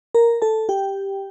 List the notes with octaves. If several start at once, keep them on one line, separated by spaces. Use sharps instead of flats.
A#4 A#5
A4 A5
G4 G5